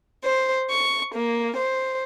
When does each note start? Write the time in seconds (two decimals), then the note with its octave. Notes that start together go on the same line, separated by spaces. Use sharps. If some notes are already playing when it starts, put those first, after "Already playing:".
0.24 C5
0.69 C#6
1.14 A#3
1.56 C5